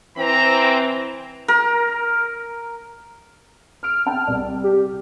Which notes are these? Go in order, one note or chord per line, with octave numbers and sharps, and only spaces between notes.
E3 C4 A#5
A#4
E6 F6 D7
C4 G5 A5
C2 D5
G4